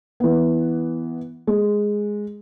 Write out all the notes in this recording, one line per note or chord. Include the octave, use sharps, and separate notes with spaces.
E3 B3
G#3